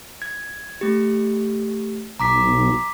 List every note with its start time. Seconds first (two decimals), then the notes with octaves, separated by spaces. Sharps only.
0.22 G#6
0.81 A3 G4
2.20 B1 A#5 D6 B6